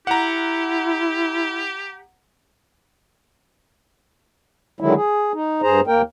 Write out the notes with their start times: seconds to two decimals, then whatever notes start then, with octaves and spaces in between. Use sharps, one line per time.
0.07 E4 G4 F#5 A#5
4.80 D3 D#3 F#3 G#3 E4
4.95 G#4
5.33 D#4
5.62 G2 G#4 C5 A#5
5.87 D#2 A#3 A#4 G5